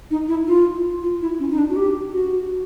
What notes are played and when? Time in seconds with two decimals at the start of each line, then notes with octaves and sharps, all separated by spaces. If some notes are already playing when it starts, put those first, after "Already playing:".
0.11 D#4
0.28 E4
0.47 F4
1.02 F4
1.21 E4
1.40 C#4
1.50 D#4
1.58 D4
1.69 F#4
1.76 G4
2.14 F#4